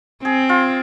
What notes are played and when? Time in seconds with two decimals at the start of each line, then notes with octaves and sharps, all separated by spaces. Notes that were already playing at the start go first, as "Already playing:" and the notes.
0.24 C4 G#4
0.49 F4